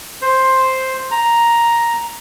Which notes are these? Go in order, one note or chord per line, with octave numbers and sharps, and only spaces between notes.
C5
A#5